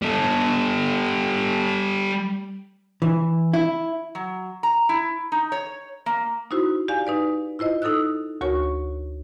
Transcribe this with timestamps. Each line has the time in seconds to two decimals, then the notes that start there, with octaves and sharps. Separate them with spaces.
0.02 G3 A4
3.02 E3
3.53 E4
4.15 F#3
4.63 A#5
4.89 E4
5.32 D#4
5.52 C#5
6.06 A#3
6.51 D#4 E4 F#4 C5
6.88 G4 D5 F5 G#5
7.07 D#4 B4 D5
7.59 E4 F4 C5 D#5
7.82 D#4 A4 D#6 E6 F#6
8.41 D2 F#4 A#4 C#5 C#6